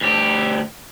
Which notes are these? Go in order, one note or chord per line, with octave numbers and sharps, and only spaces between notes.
D2 G4